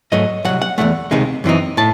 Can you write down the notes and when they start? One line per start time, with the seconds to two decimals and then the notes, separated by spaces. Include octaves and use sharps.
0.12 G#2 F#3 A3 D#5
0.45 C2 C3 F#3 F#5
0.62 F#5
0.78 E2 D#3 A3 F#5
1.11 C#2 C3 D#3 G#3 D#4
1.44 F#2 E3 C4 D#4
1.77 A2 A5